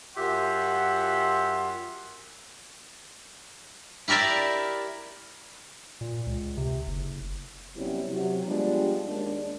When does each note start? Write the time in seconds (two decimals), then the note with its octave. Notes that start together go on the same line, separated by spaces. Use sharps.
0.17 F#2 F4 G4 E5 F#5 C6
4.08 E4 G4 A#4 D5 E5
6.01 A#2
6.26 C#2
6.57 C3
6.87 F#1
7.76 C3 F#3 G3 B3 C#4 E4
8.09 C3 F#3
8.45 F3 G3 G#3 B3 D4 G4
9.04 D#2 G#3 D4